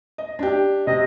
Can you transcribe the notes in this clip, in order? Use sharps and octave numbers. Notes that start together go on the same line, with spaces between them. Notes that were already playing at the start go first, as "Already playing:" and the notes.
D#5
D4 G4
C3 D#5